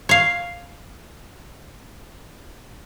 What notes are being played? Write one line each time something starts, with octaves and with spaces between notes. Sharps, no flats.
C#5 F5